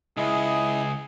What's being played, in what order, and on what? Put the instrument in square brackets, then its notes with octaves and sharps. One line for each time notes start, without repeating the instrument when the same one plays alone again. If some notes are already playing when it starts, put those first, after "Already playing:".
[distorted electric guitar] C#2 [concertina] E4 D#5 [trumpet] G#4